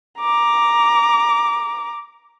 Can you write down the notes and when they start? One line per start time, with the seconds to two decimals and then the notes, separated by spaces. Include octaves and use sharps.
0.19 A#5 D6